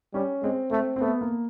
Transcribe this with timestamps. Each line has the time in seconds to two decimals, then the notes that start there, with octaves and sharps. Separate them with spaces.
0.14 G3 C#4
0.42 G#3 C4
0.71 A3 C4
0.96 C4
1.00 A3 B3
1.21 A#3